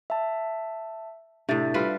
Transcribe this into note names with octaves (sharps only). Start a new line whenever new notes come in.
E5 A5
A2 C3 D4 E5 A6
G3 F4 B4